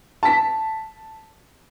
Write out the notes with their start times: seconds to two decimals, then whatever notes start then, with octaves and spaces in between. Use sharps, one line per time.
0.23 A5 B6